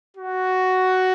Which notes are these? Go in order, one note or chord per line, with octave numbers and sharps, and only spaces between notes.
F#4